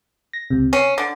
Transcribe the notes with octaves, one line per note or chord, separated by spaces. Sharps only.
A#6
C#2 C3
C#4 C7
D3